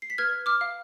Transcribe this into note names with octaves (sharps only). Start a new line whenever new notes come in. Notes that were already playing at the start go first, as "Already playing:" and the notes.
C7
B6
B4 F6 G#6
D6 F6
F5